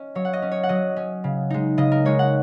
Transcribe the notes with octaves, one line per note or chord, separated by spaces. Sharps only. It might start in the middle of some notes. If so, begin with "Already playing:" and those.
Already playing: C#4 D#5
F#3 C#5
F#5
D#5
C#4
C#5
F#5
F#3 D#5
C#4
C#3
G#3 D#4
C#3 D#5
A#4
G#3 D#4 C#5
F#5